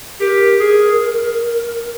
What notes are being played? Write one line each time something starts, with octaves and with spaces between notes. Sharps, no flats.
G4 A#4
G#4